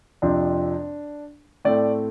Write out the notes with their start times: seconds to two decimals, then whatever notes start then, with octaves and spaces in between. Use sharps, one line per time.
0.22 F2 C3 F3 C4 D4
1.65 A2 A3 C4 D5